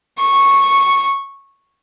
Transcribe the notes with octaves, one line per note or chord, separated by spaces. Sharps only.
C#6